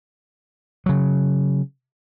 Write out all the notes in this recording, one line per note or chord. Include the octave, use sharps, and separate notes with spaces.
C#3 F#3